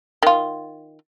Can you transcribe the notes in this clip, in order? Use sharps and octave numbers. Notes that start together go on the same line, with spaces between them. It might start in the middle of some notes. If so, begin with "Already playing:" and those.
D#3 F4